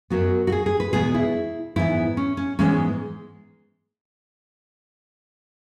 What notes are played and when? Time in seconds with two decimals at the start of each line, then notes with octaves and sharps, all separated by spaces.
0.10 F#2 F#3 B3 F#4
0.47 F#4
0.52 G#4
0.66 G#4
0.80 B4
0.93 E2 B2 G#3 B3 G#4
1.14 E4
1.76 G#2 E3 B3 E4
2.17 C#4
2.37 C#4
2.59 G#2 E3 G#3 B3 C#4